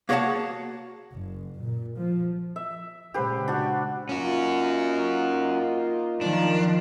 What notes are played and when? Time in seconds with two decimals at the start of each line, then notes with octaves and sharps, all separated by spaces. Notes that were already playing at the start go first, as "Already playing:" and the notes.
0.09 A#3 F#4 G#4 C#5 F#5 A5
1.13 F#1
1.60 A#2
1.98 F3
2.56 E5
3.14 A#2 C#3 G#3 G4 B4 C5
3.48 D4 F#4
4.09 A#3 C#4 D#4 F4 F#4
6.21 D#3 F3 D4